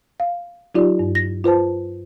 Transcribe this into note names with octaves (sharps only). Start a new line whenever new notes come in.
F5
F#3 D#4 F4 G4 D5
G2
A#6
F4 B4 C5 A5